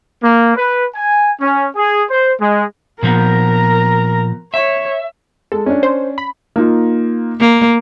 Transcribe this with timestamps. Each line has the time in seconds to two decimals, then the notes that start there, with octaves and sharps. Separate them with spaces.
0.23 A#3
0.56 B4
0.95 G#5
1.40 C#4
1.76 G#4
2.09 C5
2.40 G#3
3.03 A#2 F3 B3 A#4 A#5
4.54 C#5 E5
5.52 G#3 A4
5.66 C#4 D4
5.83 C5
6.18 B5
6.56 A#3 D#4 F4
7.40 A#3